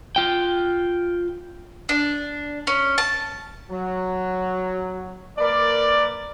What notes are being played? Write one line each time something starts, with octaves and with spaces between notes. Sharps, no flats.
F4 G5
D4
C#4
A5
F#3
A#3 A#4 B4 D5